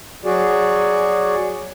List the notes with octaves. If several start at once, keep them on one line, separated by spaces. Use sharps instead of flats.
F#3 F#4 G#4 D5